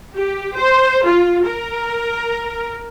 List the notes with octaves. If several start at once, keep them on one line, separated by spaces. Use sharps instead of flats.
G4
C5
F4
A#4